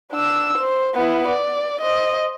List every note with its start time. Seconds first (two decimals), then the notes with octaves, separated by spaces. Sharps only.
0.12 D4 E6
0.58 C5
0.95 B3 E4
1.29 D5
1.82 C5 D#5